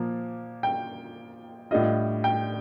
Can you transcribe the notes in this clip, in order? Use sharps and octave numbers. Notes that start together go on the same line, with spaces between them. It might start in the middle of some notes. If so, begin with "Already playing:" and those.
Already playing: A#2 F3 A#3
G5
A2 G3 D4 F4 D#5
G5